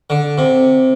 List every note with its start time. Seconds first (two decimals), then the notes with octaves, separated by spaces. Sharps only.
0.10 D3
0.38 C3